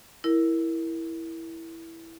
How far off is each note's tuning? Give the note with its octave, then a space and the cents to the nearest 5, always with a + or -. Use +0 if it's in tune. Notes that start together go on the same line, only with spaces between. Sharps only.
E4 +0 A#4 +0